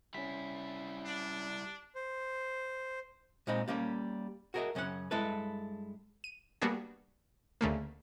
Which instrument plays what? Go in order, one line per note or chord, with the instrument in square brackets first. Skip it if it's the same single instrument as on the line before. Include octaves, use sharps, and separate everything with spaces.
[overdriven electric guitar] G3 E4 [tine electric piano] C#4 B6
[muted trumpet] D4
[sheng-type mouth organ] C5
[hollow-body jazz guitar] A#2 G#3 C4 D#4 B5
G3 A#3 C#4 G4
F#4 G#4 A#4 C#5 D#5 E5
F#2 C#3 C#4 A4 F#5
G2 G#3 E4 A4 B4
[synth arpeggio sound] D#7
G3 A#3 B3 D4 F#4 G#4
D2 C#3 A3 A#3